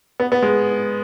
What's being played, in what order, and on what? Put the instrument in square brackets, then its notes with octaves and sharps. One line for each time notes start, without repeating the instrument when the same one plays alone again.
[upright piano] B3
B3
G#3